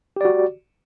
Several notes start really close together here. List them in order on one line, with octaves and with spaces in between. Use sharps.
G4 D5 F#4